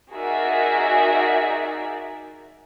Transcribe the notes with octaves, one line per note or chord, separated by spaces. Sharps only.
D#4 F#4 G#4 A#4 D5 E5